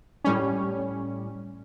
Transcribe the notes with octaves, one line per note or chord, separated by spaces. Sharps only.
A2 G3 C#4